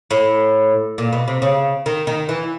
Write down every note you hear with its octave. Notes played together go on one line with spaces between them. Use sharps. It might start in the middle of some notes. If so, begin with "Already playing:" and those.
A2
A#2
B2
C3
C#3
D#3
D#3
E3